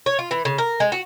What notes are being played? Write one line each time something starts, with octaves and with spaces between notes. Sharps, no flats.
C#5
F4
E3
C#3
A#4
G#3
F#4